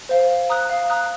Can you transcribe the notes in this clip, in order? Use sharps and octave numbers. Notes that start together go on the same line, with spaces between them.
C5 F5
F5
A#5 D#6 F#6
F5
A#5 D#6 F#6